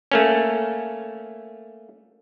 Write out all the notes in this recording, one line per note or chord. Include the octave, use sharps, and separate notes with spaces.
A3 A#3 C#4